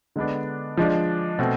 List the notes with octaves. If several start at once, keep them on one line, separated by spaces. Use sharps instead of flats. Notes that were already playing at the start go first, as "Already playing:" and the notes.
D3 G#3 B3 D4
F3 G#3 D4
B2 A3 C4